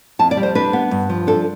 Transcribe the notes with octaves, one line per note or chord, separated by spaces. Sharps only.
F2 A5
D5
G3
C5
D4 B4
B3
G2
F3
D4 A4